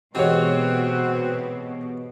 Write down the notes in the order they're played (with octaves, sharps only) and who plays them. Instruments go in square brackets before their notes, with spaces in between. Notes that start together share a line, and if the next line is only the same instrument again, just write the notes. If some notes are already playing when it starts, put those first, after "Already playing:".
[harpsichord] G#2 E3 [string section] B2 [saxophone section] C4 F#4 [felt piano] G4 C#5